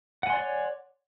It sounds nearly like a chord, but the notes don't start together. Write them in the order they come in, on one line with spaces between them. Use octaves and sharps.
F#5 G#5 C6 D5 C#5